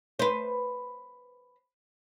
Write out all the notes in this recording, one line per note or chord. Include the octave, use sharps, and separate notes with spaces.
B4 C5